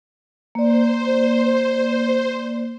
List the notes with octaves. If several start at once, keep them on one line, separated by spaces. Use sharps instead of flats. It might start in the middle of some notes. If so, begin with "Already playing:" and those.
A#3 C5 D5